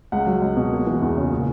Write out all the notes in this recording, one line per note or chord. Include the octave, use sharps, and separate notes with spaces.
C#2 F#5
F#3
C#2
B2
A#3
E3
E2
C#3
A#2